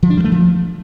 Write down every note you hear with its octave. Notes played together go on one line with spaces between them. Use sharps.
F3
D4
G3
A3
F3